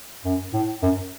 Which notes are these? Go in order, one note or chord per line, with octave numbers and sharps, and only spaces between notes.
F#2
A2
F#2